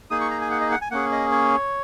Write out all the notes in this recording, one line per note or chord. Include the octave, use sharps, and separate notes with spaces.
A#3 D#4 G#4 D#6
C#6
A#5
G#5
F#5
D#5
F#5
G#5
A#3 C#4 G#4 F#5
D#5
C#5